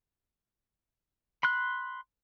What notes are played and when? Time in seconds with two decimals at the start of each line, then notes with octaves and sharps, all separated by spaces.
1.43 B5 C6 F#6